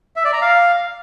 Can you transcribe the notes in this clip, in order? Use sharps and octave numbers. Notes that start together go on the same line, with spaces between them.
E5
D5
A#5
F5